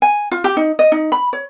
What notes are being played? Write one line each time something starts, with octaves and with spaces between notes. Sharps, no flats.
G#5
F4
G4
D#4
D#5
D#4
B5
C#5